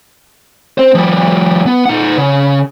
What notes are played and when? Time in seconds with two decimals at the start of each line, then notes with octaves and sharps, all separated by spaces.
0.78 C4 C5
0.95 F3 G3
1.66 B3
1.86 D#4 F#5
2.17 C#3